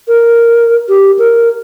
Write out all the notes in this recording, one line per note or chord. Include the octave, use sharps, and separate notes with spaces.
A#4
G4
A#4